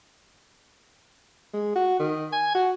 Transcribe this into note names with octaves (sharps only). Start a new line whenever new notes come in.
G#3
F#4
D#3
G#5
F#4